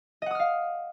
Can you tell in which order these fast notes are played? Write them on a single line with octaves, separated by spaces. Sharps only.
D#5 F#5 D#6 F6 F5